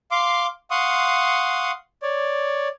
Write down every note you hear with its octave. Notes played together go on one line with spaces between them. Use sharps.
F5 C6 D6
F5 F#5 C6 C#6 D#6
C#5 D5